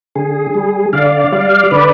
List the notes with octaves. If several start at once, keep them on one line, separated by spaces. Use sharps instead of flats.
D3 G#4
G3
D3 D5 F5
G3 D5 F5
D3 B4 D5